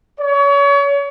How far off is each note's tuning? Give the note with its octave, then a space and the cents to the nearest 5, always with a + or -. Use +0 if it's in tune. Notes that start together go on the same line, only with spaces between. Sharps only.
C#5 +35